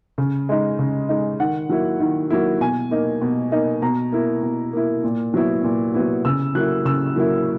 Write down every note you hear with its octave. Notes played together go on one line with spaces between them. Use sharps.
C#3
G#3 D#4
C#3
G#3 D#4
D#3 F#5
F#3 A#3 E4
D#3
F#3 A#3 E4
B2 G#5
A#3 D#4
B2
A#3 D#4
B2 A#5
A#3 E4
B2
A#3 E4
A#2
F#3 B3 E4
A#2
F#3 B3 E4
C#3 E6
F#3 A#3 E4 F#6
C#3 E6
F#3 A#3 E4